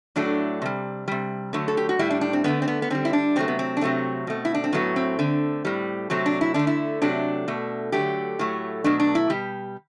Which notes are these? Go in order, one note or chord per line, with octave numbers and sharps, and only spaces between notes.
A2 F#3 A3 D4
C3 G3
C3 G3
D3 F#3 A3
A4
G4
F#4
A2 G3 E4
D4
D4
C4
D3 A3 B3
C4
B3
B3
D3 G3 C4
E4
D4
C3 F#3 A3 C4
B3
C4
D4
C3 F#3 A3 C4
B2 A3
E4
D4
C4
A2 F#3 A3 B3
C4
D3 A3
A2 G3
C3 F#3 A3 C4
D4
E4
D3 A3 D4
E4
C3 F#3 A3 D4
B2 A3
D3 F#3 A3 G4
A2 F#3 A3
B2 F#3 A3 D4
D4
E4
B2 G3 G4